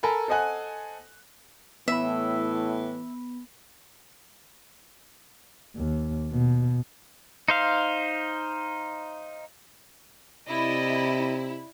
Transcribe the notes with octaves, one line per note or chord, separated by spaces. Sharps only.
A4 A#4 G#5 A#5 B5
A4 C5 D#5 F#5 G#5 F#6
A2 E3 B3 E5 B5
D#2
B2
D#4 C5 F5
C3 E4 D5 D#5